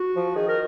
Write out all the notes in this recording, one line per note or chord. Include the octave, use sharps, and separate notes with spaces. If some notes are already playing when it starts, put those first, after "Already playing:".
Already playing: F#4
F3
D#3 G#4
A#4